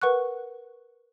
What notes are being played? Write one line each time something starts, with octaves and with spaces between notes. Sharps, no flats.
A#4 B4 F#5 C#6 F#6